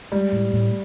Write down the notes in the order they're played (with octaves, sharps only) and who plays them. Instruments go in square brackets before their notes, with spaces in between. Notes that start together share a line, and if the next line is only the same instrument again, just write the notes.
[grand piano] G3 [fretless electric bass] G#3
[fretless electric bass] A2
A2